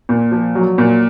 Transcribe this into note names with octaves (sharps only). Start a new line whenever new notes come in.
A#2
F3
F#3
A#2